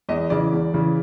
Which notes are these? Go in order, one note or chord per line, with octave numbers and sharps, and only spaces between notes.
E2 D#5
C#3 E3 D5
E2
C#3 E3